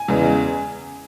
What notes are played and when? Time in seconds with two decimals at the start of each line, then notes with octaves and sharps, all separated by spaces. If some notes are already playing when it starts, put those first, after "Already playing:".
Already playing: G#5
0.08 E2 C#3 E3 G#3